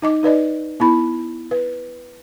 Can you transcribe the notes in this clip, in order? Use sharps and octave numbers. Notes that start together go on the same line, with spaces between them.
D#4 D#5 D6
D#4 B4 D5 D#5
B3 E4 B5
B4